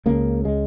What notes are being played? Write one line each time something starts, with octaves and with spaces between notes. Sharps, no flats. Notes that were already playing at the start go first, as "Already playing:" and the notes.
C#2 C#3 A#3
G#3